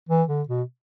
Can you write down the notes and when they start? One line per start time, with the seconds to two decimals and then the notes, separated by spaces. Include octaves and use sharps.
0.09 E3
0.28 D3
0.48 B2